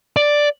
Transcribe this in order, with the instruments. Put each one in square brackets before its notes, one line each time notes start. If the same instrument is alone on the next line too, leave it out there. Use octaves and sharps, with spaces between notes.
[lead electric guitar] D5